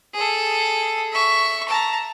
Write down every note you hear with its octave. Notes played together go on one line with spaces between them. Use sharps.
G#4 A4
E5 C#6
A5 A#5